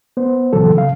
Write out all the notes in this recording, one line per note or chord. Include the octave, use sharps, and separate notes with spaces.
B3 C5
A#2 C#3 E3 F#3 A4
C#3 F5